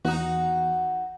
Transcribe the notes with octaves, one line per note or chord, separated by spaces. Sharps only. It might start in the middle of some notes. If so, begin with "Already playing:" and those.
E2 D#4 F#4